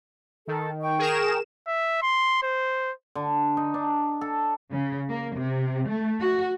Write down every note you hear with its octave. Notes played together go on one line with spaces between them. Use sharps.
D#3 A4
G5 C#6
G#4 A#4 E7
E5
C6
C5
D3
D#4
D4
A4
C#3
A#3
C3
A3
F#4